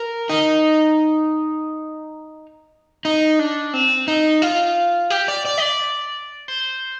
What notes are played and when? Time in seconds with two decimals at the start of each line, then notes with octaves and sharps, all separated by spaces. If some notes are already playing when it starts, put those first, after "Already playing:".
Already playing: A#4
0.29 D#4
3.05 D#4
3.39 D4
3.74 C4
4.08 D#4
4.42 F4
5.10 G4
5.28 D5
5.45 D5
5.58 D#5
5.62 D5
6.48 C5